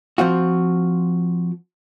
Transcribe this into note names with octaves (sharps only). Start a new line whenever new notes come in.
F3 C4 F4 F#4